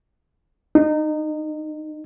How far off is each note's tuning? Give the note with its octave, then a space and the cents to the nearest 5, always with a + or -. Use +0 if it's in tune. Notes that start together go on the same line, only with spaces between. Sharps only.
D#4 -25